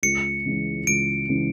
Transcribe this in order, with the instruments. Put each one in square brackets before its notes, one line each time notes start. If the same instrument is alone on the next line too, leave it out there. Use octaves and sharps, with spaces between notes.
[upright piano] C#2 [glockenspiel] C#7
[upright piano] C#3 E3 G#3 C#4
[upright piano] C#2 [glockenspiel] D7
[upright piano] C#3 E3 G#3 C#4